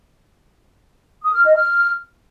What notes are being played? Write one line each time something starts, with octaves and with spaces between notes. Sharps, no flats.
D#6
F6
D#5
F6